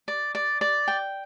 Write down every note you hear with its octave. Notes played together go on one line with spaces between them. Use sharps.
D5
D5
D5
G5